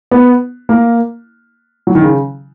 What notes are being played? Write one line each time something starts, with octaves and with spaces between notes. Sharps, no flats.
B3
A#3
F#3
D#3
C#3